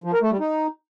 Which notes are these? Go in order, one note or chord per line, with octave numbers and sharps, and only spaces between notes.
F3
A#4
A3
G3
D#4